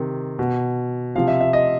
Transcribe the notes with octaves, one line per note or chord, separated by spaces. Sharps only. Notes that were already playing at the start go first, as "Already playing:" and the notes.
Already playing: C3 D#3
B2
C3 F3 F5
E5
E5
D#5